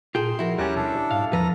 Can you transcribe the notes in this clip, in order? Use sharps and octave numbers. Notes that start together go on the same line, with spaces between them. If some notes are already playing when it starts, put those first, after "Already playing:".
A#2 F4 G#4 A4 G5 C6
F3 E4 F#4 A#4
D#2 G3 C#4 G4 A#5 F#6
B2 D4 A4
G#2 F5
E2 F3 A4 B4 A#5